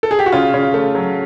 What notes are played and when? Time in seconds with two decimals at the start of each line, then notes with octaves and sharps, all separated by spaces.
0.03 A4
0.11 G#4
0.19 G4
0.26 F#4
0.32 C#3 F4
0.54 C#3
0.74 A3
0.95 F#3